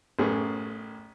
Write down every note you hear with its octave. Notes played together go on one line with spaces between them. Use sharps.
A1 F#2 A3 C#4 G#4 B4